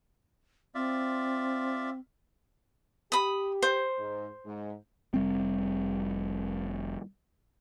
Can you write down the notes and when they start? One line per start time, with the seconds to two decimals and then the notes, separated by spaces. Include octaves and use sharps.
0.75 C4 F4 D5 E5
3.12 G4 B5 D#6
3.62 C5
3.98 G#2
4.45 G#2
5.14 F1 G3 C4